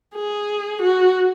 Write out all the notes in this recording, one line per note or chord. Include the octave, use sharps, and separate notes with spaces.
G#4
F#4